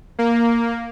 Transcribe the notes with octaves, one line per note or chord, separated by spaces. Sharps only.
A#3